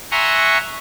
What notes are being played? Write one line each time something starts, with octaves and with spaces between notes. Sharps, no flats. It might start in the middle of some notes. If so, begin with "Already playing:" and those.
E5 F#5 G#5 A#5 C6 C#6